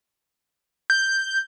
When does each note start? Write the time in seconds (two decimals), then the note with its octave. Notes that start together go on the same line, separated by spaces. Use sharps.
0.90 G6